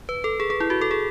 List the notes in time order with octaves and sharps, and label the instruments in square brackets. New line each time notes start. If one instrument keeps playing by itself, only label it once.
[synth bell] B4
A4
G#4
G#4
E4
F#4
A4
G#4